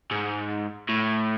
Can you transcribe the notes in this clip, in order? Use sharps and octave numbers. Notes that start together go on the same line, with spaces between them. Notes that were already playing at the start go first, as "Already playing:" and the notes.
G#2
A2